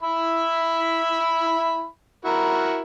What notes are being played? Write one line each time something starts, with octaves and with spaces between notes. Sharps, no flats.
E4 E5 B5
E4 F#4 A#4